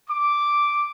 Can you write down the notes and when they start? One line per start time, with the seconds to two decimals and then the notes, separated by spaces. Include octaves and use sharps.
0.10 D6